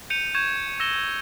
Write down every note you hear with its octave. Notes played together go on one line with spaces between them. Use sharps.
G6 C#7 D#7 F7
C#6 G6 G#6 E7
E6 A#6 E7 G7